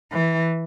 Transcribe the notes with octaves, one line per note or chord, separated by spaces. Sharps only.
E3